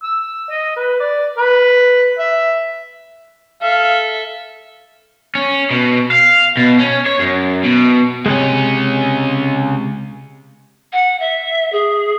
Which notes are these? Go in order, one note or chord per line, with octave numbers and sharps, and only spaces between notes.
E6
D#5
B4
D5
B4
E5
A4 E5 F5
C#4
B2
F5
B2
C#4
C#5
F#2
B2
C#2 C3 G#3 C#4
F#5
E5
G#4